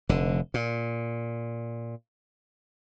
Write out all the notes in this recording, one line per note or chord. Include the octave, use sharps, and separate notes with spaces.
F1 D3
A#2